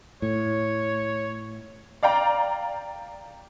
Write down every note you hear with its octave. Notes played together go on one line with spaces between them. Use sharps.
A2 C#5
D5 F5 G5 A#5